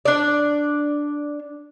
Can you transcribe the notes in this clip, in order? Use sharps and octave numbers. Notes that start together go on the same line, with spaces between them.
D4 D5